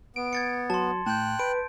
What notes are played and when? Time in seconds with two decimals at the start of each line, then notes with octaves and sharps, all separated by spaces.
0.16 B3 D7
0.33 G#6 A6 C#7
0.70 F#3 A5 C6
1.06 A2 G5 A5 F#6 G6
1.39 B4 D7